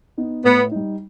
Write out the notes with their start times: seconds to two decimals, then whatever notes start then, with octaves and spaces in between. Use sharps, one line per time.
0.17 B3 D#4
0.44 A2 B3
0.71 G3 D#4